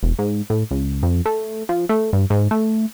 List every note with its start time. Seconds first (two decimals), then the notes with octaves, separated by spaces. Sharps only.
0.03 E1
0.19 G#2
0.50 A2
0.71 C#2
1.03 F2
1.26 A3
1.69 F3
1.89 A3
2.13 G2
2.30 G#2
2.51 A3